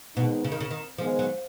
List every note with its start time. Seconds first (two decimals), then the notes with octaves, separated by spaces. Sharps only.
0.16 B2 D#3 G#3 B3 D#4
0.44 C#3
0.52 D#3
0.60 C#3
0.71 D#3
0.98 D#3 F3 G#3 B3
1.19 F#3